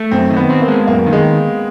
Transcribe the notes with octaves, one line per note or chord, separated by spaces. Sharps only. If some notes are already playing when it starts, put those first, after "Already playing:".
Already playing: A3
F#2 C4
D#3
B3
C4
A#3
G#3
F#2 A#3
D#3
G#3